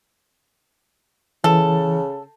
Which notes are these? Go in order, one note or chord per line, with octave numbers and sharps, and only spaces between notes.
C#3 E3 A4